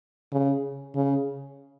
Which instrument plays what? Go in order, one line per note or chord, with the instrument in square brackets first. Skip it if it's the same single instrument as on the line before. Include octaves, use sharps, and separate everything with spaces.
[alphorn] C#3
C#3